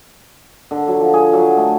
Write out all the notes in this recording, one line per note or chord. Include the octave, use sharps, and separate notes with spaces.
D3
F#3
F3
G#4
F#3
A3